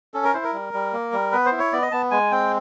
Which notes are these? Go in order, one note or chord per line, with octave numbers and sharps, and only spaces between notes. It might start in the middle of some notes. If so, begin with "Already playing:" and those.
C#4 A4
A#4
E4 C5
A#4
G3
G3
A#3
G3
B3 B4
C5
E4
C#5
B3 D5
D#5
B3 A5
G#3 G#5
C4 G5